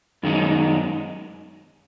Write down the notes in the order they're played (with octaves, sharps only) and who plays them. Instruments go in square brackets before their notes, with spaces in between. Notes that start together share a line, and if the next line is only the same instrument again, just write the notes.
[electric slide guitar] F#2 D#3 G#3 D#4